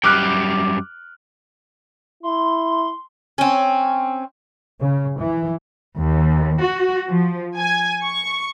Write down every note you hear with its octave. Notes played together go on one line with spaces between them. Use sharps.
F#2 G3 G5 D6 F6 F#6
E4 C6
C4 C#4
C#3
E3
D#2
F#4
F3
G#5
C#6